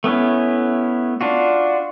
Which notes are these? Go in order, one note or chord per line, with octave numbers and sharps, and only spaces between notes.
A3 B3 C#4 E4
D4 F4 F#4